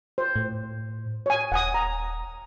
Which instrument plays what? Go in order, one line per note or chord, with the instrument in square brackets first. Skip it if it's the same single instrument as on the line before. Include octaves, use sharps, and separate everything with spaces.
[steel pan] C5
[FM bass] A2
[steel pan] C#5 G#5
[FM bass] D#1 [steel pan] F#5 G#5 D#6
[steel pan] A#5